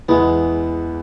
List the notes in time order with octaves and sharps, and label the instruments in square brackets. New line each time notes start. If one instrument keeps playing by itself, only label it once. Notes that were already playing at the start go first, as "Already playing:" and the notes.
[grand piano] E2 E3 [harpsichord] G#3 B3